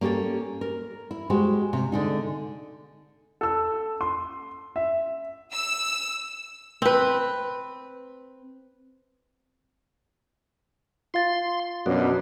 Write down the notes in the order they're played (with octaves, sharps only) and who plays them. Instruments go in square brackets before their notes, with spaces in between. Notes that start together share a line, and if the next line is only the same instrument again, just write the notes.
[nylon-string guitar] A#3 C#4 G4 A4 C#5
A#4
E4
G#3 F#4 G4 C5
C3
D3 G#3 D#4
[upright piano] A4 E6
C6
E5
[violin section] E6
[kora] C4 B4
[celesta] F4 F5 A6 [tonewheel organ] C6
[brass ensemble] F#2 B2 [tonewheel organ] F#3 B3 D4